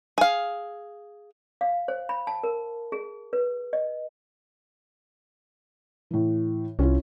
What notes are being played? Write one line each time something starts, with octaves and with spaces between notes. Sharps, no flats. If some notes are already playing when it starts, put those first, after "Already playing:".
G#4 F5
F5
C5
B5
A5
A#4
G#4
B4
D#5
A2 E3
C2 C#4 E4 F4